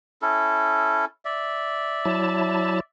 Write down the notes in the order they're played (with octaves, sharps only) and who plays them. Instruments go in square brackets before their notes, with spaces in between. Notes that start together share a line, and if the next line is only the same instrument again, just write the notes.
[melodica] C#4 E4 A4
D5 E5
[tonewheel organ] F#3 E4 A5